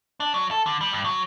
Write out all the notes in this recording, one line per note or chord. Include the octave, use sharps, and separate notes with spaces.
D4
F#3
A4
D3
G3
G2
F#3